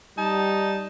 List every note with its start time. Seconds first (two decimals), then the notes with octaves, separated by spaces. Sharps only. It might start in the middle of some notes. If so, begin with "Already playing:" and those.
0.18 G3 D#4 A5